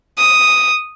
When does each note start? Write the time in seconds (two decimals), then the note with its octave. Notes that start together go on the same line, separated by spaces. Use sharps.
0.18 D#6